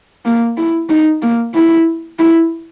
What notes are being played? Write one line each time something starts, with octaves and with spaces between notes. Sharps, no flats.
A#3
E4
D#4
A#3
E4
E4